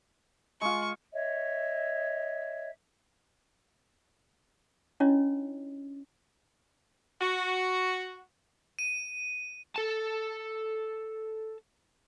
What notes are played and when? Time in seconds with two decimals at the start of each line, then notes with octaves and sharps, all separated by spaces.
0.61 G#3 F4 C#6
1.13 C#5 D#5 E5
5.00 C#4 D4 E4 F4 C#5 D#5
7.21 F#4
8.79 D#7
9.76 A4 A5